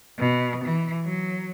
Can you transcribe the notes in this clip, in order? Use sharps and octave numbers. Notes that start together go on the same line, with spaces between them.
B2
E3
F#3